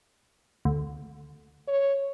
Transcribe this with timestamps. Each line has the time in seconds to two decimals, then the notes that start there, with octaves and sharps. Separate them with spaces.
0.65 D2
1.68 C#5